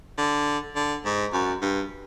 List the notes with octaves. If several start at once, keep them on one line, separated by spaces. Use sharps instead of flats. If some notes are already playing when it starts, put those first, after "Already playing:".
D3
D3
G#2
F#2
G2